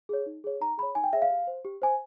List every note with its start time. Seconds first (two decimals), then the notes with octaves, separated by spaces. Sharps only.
0.09 G#4 C#5
0.26 D#4
0.44 G#4 C#5
0.61 D#4 A#5
0.78 G#4 B5
0.83 C#5
0.95 D#4 G#5
1.04 G5
1.13 G#4 E5
1.16 C#5
1.22 F5
1.30 G4
1.47 C5
1.65 G4
1.82 C5 G#5